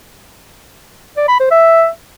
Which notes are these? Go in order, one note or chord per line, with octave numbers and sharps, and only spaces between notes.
D5
B5
C5
E5